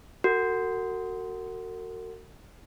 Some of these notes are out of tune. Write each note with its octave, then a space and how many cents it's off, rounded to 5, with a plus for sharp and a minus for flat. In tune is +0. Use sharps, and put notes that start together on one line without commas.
F#4 +10 A#4 -45